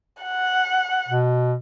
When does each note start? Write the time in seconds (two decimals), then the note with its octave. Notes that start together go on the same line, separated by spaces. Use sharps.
0.23 F#5
1.08 B2